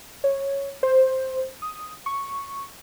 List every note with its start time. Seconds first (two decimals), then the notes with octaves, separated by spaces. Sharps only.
0.24 C#5
0.83 C5
1.62 D#6
2.06 C#6